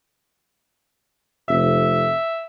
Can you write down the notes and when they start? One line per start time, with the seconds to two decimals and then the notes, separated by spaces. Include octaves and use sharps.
1.48 F1 E5